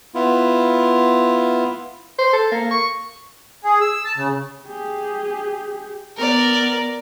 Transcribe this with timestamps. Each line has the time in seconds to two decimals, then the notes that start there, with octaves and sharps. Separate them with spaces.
0.15 B3 E4 F4
2.19 C5
2.33 A4
2.52 A#3
2.71 C#6
3.64 G#4
3.81 E6
4.05 A5
4.17 C#3
4.67 G4 G#4
6.17 B3 A#4 D5